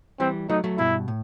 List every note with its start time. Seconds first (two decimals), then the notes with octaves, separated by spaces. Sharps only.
0.20 E3 G3 C4
0.49 F#3 A3 D#4
0.64 F#3 A3
0.78 G2 B2 E4
1.08 A2